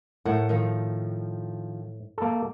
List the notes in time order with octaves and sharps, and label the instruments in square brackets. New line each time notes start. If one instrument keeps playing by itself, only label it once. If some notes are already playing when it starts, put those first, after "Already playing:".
[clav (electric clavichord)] A2 [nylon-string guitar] A3 A#4 F#5
[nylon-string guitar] D#3 F3
[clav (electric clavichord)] A#3 A4